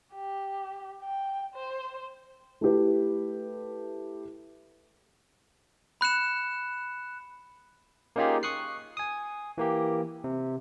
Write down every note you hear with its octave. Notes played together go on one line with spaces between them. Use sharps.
G4
G5
C5
A3 E4 G4 B4
B5 F#6 C#7 E7
A#3 C#4 D#4 F4 G4 G#4
C#6 D#6 F#6 C7
G#5 D#6
E3 A#3 G4
C3